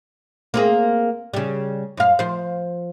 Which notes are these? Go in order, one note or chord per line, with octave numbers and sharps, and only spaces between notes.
A#3 C4 G#4
C#3 G3
F#2 F5
F3 C5